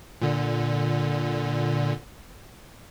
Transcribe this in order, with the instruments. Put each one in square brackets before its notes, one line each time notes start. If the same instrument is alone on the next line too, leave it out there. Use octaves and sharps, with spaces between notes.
[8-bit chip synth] A#2 D3